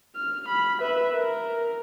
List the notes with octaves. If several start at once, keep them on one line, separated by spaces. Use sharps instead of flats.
F6
B5
B4 E5
A#4